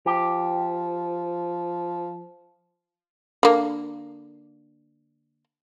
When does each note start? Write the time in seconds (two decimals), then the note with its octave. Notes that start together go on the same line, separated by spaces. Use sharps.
0.06 F3 G4
3.43 D3 A#3